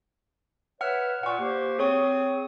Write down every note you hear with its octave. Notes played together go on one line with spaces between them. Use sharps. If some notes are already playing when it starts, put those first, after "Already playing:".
B4 C#5 E5 F#5 F6
A#2 F#5 C#6
A#3 G4 C5
C4 G#4 C#5 C#6 D#6